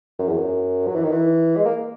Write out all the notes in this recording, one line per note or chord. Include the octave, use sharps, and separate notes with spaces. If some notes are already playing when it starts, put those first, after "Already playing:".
F#2
E2
F#2
F#3
E3
D#3
E3
G#3
A#3